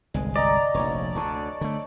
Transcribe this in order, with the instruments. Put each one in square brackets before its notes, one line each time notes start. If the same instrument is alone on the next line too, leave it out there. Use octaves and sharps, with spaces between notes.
[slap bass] G1 C2 G#3 [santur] G#5
[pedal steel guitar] D5 [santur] D#5 A#5
[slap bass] F1 A#1 [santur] C#5
[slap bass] D2 D3 [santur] A5 C#6
[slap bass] D3 A3